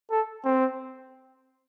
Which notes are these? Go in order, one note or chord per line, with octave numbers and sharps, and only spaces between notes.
A4
C4